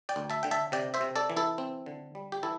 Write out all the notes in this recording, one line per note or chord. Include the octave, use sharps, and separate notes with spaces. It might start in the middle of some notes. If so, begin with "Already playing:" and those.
D5 G5
D2
E5 A5
D3 G5
E5 A5
C3 D5 G5
C5 E5
C3
A4 D5
E3
E4 A4
C4
D3
G3
G4
E3 E4 A4